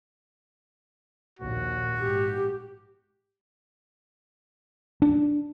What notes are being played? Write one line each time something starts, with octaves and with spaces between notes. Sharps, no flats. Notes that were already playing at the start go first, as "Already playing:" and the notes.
A#1 D#2 F#4
G#2 G4
D4